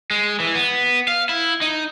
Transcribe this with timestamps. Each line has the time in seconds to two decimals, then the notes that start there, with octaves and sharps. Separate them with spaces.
0.11 G#3
0.40 E3
0.55 B3
1.08 F5
1.29 E4
1.62 D#4